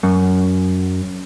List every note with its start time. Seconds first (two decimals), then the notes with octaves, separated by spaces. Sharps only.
0.03 F#2